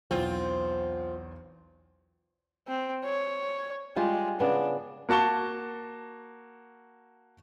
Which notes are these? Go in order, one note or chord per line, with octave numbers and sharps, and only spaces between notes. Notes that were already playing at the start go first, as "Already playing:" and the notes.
B1 E2 C4 F4 C5
C4
C#5
G3 G#3 F4 G4
C#3 B3 D4
A#3 F#4 A5 C#6 G7